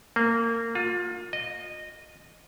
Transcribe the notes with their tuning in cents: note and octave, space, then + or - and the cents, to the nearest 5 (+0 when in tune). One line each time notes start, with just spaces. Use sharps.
A#3 -20
F4 +30
D#5 -15